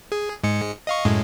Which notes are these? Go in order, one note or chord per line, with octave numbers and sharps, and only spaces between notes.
G#4
G#2 G#3 C#7
D#5 F5 C#6
F#2 A2 G#3